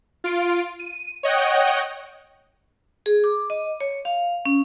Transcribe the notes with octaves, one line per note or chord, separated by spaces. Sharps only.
F4 D7
D#7
C#5 D#5 F#5 G5
G#4
D6
D#5
C#5
F5
C#4